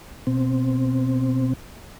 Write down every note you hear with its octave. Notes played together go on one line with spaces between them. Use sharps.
B2 C4